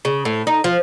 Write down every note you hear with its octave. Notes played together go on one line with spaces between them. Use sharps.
C#3
A2
D#4
F3